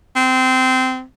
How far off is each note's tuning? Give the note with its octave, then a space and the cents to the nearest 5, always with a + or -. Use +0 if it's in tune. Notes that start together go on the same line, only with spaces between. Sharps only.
C4 -20